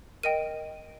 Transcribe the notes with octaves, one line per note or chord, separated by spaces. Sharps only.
A#4 D#5 G5 D#7